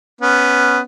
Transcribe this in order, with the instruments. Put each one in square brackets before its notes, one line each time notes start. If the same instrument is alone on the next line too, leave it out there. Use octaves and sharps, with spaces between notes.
[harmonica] B3 C#4